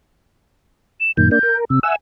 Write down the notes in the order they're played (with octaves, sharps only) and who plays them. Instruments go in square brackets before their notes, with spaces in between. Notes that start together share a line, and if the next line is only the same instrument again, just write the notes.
[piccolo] E7
[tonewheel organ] F#2 A#2 D#3 [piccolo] G6
[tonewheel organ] A#3 D4 [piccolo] G6
[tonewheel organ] A#4
[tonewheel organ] C3 [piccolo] E6
[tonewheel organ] E5 F#5 E6 [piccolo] G#5